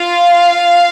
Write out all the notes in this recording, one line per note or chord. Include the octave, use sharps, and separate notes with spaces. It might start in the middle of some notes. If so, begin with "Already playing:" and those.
Already playing: F4 F5